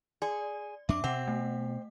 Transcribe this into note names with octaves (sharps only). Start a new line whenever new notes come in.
G#4 D5
F2 D4 E5 D6
B2 C4 F#5
A3